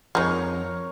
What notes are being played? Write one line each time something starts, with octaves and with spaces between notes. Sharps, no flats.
F2 F3 G#3 D#4 A#4 C#5